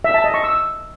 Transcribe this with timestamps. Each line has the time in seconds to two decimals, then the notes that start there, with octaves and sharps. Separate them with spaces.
0.04 E5
0.14 A5
0.24 D#5
0.34 C#6
0.44 E6